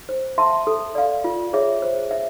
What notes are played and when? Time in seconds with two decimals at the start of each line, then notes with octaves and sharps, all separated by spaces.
0.09 C5
0.38 E5 A5 C6
0.67 A4
0.95 D5 F5
1.24 F4
1.53 G#4 C#5 E5
1.82 C5
2.11 E5